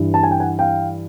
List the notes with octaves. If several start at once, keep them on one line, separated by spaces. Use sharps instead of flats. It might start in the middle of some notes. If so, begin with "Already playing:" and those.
Already playing: G2 E3
A5
G#5
G5
F#5 G#5
F5 G5